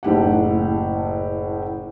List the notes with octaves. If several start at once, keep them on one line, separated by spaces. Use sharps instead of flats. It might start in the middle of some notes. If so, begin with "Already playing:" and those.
F#1 A2 G4 F#5